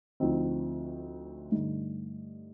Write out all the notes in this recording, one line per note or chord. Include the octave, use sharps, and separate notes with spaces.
D2 D3 F3 C4 D#4
G2 D3 A3 D#4